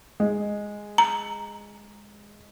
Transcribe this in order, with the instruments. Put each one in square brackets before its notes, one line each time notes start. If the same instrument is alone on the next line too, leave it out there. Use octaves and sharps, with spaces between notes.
[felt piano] G#3
[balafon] A#5